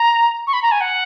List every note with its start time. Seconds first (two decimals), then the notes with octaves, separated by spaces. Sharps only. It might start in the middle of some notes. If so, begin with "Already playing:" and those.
Already playing: A#5
0.46 C#6
0.53 B5
0.62 A#5
0.71 G#5
0.80 F#5